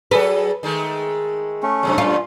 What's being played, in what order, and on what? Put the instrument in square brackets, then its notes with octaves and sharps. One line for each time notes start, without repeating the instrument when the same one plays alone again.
[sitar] F#3 G#4 A4 [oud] B4
[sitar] D#3 G#3 A3
[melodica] A3 C#4
[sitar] F#2 C3 F#3
[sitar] F#2 A#2 [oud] F4